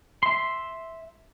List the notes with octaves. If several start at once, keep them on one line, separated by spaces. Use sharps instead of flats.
E5 C6